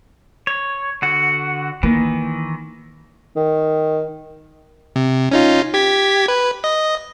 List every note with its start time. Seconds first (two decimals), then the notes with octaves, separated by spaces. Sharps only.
0.47 C#5
1.02 D3 F#4
1.83 D#3 E3 A#3
3.36 D#3
4.96 C3
5.32 C#4 D#4 F4
5.74 G4 G#6 B6
6.28 B4
6.64 D#5